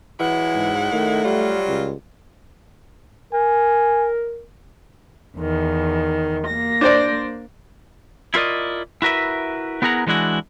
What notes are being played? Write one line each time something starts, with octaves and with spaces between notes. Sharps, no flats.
E3 F#3 G#3 E4 F#5
G#2
D#3 A3
F#3 G3 F4
C#2
A#4 G#5
E2 D#3
A#3 A#6
D4 C5 D5
E4 F4 A#4 D5 D#5
E4 F#4 A#4 B4 E5
B3 E4 G#4 A#4 F#5 A#5
E3 G#3 D4 E4 F#4